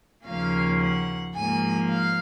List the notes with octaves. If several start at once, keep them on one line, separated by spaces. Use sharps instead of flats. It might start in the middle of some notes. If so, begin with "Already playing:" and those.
D#2 C#3 F3 A#3 C#4 F5
F#5
G#2 F3 A#3 G#5
F5